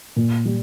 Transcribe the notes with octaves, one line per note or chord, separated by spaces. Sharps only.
A#2
G3